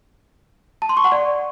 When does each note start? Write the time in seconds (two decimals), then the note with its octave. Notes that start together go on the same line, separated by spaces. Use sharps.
0.82 A5
0.89 C6
0.97 C#6
1.04 F#5
1.12 D5